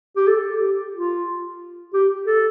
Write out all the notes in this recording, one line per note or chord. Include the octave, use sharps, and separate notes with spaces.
G4
A4
G4
F4
G4
A4